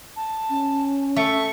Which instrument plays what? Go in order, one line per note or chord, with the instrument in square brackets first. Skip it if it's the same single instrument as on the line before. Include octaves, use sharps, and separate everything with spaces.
[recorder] A5
[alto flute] C#4
[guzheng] A3 [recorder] E5 [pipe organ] C#6